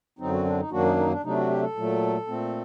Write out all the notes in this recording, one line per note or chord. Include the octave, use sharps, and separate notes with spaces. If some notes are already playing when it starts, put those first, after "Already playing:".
F#2 D3 F#3 C4 D#4
F#4
D4
D#4
F#2 D#3 F#3 A#3 D4 F#4
D#4
D#4
D4
C3 F#3 A3 D4 D#4
F#4
G4
A4
A#2 F#3 A3
A#2 A3 C4